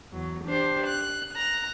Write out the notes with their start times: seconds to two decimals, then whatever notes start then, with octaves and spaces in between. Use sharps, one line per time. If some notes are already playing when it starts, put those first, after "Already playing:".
0.11 E2 F#3
0.45 D4 G4 C5
0.87 F#6
1.32 A#5 F#6